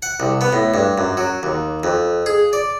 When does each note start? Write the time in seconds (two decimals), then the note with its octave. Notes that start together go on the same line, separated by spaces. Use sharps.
0.02 F#5
0.20 C2
0.41 B3
0.53 A2
0.74 G2
0.98 F#2
1.17 F#3
1.43 D#2
1.84 F2
2.26 G#4
2.53 D5